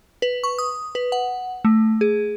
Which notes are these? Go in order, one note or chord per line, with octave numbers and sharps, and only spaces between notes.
B4
C#6
D#6
B4
F#5
A3
G#4